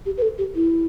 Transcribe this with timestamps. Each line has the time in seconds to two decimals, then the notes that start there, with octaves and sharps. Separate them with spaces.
0.06 G4
0.17 B4
0.22 A4
0.38 G4
0.55 E4